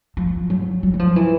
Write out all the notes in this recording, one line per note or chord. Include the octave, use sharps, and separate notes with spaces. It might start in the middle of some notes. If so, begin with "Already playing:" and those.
F3
F#3
F#3
F#3
F3
E3